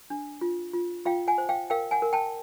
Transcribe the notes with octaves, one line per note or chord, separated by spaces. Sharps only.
D4
F4
F4
F4 F5 G5
F#5 G#5
C5
F5 G5
A#4 F5 G5
F#5 G#5
A#4
G5 A5